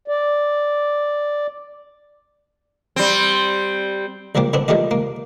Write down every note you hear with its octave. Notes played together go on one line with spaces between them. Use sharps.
D5
G3 C4
A#1 F3 G3 A#3 G4
D3 B3 C4 D4
D#3 G3 A3 F4 G4 D#5
A#3